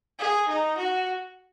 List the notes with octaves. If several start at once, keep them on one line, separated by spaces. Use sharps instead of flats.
G#4
D#4
F#4